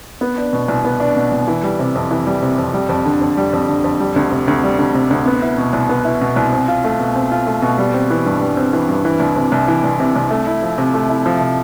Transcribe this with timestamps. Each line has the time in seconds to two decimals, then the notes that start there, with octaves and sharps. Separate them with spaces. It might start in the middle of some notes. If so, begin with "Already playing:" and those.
0.21 B3
0.37 D4
0.53 B2
0.68 C2
0.85 B3
1.00 D4
1.16 B2
1.32 C2
1.48 E3
1.63 G3
1.79 C3
1.95 F2
2.11 E3
2.27 G3
2.42 C3
2.58 F2
2.73 G3
2.89 F2
3.05 D3
3.21 F2
3.37 G3
3.53 F2
3.68 D3
3.84 F2
4.00 G3
4.16 D2
4.32 C3
4.48 D2
4.63 G3
4.79 D2
4.94 C3
5.10 D2
5.26 B3
5.42 E4
5.58 B2
5.73 C2
5.89 B3
6.05 E4
6.21 B2
6.36 C2
6.52 C4
6.68 F4
6.84 A3
7.00 B2
7.16 C4
7.31 F4
7.47 A3
7.62 B2
7.78 G3
7.94 C4
8.10 E3
8.26 G2
8.41 G3
8.57 C4
8.73 E3
8.89 G2
9.05 E3
9.20 C2
9.36 C3
9.52 C2
9.68 E3
9.83 C2
10.00 C3
10.16 C2
10.30 A3
10.47 E4
10.62 F3
10.78 C3
10.94 A3
11.10 E4
11.26 F3
11.41 C3